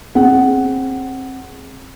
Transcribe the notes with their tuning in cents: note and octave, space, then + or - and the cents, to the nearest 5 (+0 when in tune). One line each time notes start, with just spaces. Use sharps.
C4 +25 G#4 +5 F#5 +10